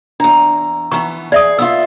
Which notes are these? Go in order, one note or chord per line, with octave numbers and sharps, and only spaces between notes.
E2 D4 A#5
E3 B3 D#4 A#5 C#6
G#4 D5 E5 D#6
B3 E4 F4 E6